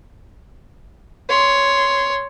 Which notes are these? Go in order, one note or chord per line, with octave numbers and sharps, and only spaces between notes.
C#5 C6